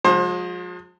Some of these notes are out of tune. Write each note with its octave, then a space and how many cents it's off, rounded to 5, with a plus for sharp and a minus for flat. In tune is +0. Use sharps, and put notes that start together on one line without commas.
F3 +45 G#3 +0 C5 +30